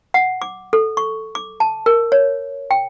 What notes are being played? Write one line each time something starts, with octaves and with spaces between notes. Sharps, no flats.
F#5
D6
A4
C#6
D6
A5
A#4
C#5
G5